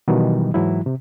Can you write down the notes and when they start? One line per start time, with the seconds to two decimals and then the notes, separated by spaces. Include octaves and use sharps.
0.08 B2 D#3 E3 F#3 G3
0.54 G#2 E3 F#3 E4
0.86 C3